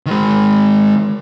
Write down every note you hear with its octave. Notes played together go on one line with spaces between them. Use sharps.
D#3 G#3